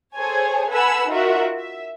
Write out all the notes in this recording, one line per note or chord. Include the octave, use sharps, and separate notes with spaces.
G#4 A4 C5 C#5 G#5
A4 B4 F#5 G#5 B5 E6
D#4 F4 F#4 A#4 E5
E5